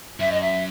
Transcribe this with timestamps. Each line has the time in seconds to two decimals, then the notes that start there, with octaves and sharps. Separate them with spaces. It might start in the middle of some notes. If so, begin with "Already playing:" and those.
0.19 F#2 E5
0.31 D#5
0.40 E5